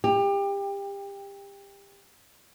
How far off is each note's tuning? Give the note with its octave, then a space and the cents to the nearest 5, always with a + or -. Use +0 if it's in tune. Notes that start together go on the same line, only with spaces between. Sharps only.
G4 +25